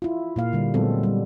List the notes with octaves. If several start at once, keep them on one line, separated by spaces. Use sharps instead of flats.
E4 F4
A#2 A#3 F5
D3 G3
A#2 F#3 G#3 B3 C4 A4
G3